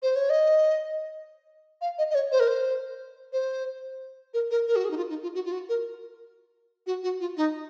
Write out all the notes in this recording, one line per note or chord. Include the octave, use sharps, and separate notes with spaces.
C5
C#5
D#5
F5
D#5
D#5
C#5
C5
A#4
C5
C5
A#4
A#4
A#4
F#4
G#4
D#4
F4
D#4
F4
F#4
F4
F#4
A#4
F#4
F#4
F4
D#4